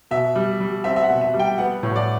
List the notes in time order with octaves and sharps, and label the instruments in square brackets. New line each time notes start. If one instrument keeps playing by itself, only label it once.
[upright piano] B2 E5
G3
G3
C4 E5
E5
F#5
B2
E5
G3
G5
B3 F#5
A2
D5